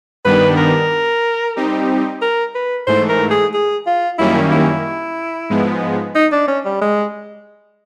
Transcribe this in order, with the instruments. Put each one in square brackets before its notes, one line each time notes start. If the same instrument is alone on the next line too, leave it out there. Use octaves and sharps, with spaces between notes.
[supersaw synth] G2 D#3 G3 B3 D4 [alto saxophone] B4
[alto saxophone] A#4
[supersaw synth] G3 C4 D#4 G4
[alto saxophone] A#4
B4
[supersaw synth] G#2 E3 A3 [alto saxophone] C5
[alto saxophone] A#4
G#4
G#4
F4
[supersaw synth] F#2 D#3 G3 A#3 C#4 [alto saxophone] E4
[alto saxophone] E4
[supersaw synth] G#2 F3 G#3 B3
[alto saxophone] D#4
D4
C#4
G3
G#3